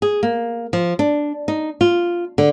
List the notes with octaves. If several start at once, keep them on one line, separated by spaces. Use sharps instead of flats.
G#4
A#3
F3
D4
D#4
F4
D3